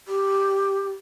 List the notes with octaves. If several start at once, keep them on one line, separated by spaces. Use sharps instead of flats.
G4